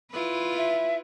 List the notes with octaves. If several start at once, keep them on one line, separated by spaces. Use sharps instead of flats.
E4 F4 B4
E5